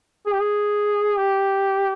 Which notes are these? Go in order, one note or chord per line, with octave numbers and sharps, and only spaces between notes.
G#4
G4
G#4
G4